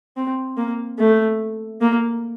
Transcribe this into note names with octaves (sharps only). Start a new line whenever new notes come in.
C4
A#3
A3
A#3